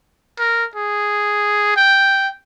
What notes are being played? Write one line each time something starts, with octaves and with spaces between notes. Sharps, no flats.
A#4
G#4
G5